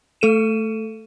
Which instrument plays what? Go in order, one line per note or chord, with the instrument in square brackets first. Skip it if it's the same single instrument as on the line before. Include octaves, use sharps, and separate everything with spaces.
[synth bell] A3 A4 D#7 E7